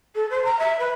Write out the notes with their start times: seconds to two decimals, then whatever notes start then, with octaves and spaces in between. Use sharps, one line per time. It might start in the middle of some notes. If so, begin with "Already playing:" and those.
0.15 A4
0.30 C5
0.44 A#5
0.59 E5
0.79 B4